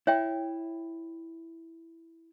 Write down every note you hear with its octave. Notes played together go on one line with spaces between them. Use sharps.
E4 C#5 E5 G5